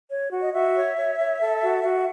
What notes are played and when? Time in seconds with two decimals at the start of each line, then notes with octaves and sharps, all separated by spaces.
0.08 C#5
0.30 F#4
0.42 D#5
0.52 F#4 E5
0.74 C#5
0.96 C#5
1.18 C#5
1.40 A4
1.62 F#4
1.84 F#4